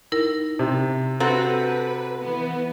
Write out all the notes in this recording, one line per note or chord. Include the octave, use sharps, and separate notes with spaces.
D#4 E4 A#4
C3
C4 F#4 A4 B4 A#5
E3 B3